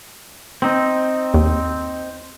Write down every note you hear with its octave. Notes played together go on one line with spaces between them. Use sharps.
C4 D#4
D#2